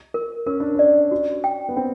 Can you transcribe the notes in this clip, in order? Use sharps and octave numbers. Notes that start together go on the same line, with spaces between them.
A#4
C#4 A#4
D4
C#4 D5
F#4
G5
B3
C4 G5